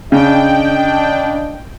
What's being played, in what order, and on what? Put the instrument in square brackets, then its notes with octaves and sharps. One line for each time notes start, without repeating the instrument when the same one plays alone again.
[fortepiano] C#3 [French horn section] D4 D#5 [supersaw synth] G5